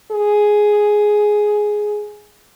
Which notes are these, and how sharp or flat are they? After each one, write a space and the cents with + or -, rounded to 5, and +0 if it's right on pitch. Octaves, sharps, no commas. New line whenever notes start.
G#4 +5